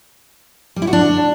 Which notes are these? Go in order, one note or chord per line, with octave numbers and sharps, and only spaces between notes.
G3
E4
F#4
D4